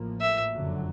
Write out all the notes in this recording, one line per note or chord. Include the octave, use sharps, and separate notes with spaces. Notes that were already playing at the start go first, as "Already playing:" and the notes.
Already playing: A1 A2 F3 A#3
E5
F#1 F2 D3 F#3